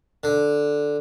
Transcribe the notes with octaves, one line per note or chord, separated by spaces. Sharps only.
D3